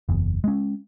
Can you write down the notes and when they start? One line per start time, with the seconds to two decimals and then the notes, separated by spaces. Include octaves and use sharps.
0.09 F#1 E2
0.44 G#3 C#4